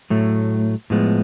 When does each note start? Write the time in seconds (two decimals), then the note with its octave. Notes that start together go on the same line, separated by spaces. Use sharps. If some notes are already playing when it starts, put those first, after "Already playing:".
0.10 A2 F#3 A3
0.90 A2 F3 G#3 B3